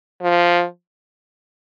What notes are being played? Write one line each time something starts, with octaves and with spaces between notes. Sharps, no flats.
F3